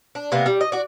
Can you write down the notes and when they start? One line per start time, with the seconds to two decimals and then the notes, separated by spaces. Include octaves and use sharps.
0.15 D4
0.32 C3 A#3 B3
0.46 G3
0.61 D#5
0.72 F#4 D5